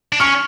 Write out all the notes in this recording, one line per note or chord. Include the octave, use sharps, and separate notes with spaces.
D4
C#4 C#6 F6